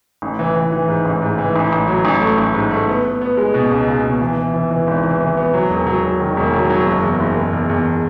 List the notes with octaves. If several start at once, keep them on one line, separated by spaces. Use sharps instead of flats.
A1
E3
E3
E3
G#2
A1
G#2
E3
A1
A1
F#3
A1
A3
A1
G#2
A3
B3
B3
B3
G#3
B2
C#2
C#2
B2
E3
E3
E3
E3
G#1
E3
E3
B3
F#3
E1
F#3
F#3
D#3
E1
F#3
F#3
F#1
E2
F#1
F#1
E2
E2